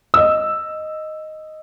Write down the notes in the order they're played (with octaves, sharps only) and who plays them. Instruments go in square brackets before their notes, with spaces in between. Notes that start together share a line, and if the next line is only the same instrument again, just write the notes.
[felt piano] D#5 E6